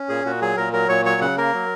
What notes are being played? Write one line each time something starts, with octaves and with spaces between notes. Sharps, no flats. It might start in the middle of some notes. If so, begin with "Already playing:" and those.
Already playing: C#4
A#2 G#4
A#2 F#4
F#3 G#4
A#2 A#4
F#3 A#4
A#2 C#5
F#3 C#5
C#3 F#5
A#3 A#4
F#3